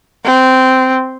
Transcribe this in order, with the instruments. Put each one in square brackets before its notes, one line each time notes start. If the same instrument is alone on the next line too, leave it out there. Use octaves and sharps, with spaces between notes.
[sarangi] C4